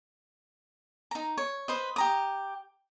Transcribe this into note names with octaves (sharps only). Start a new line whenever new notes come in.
D#4 A#5
C#5
B4 C5 D#5
G4 A#5 D#6